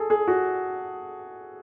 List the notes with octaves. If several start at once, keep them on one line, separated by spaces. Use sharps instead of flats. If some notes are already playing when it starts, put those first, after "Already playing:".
Already playing: G#4 A4
G#4
F#4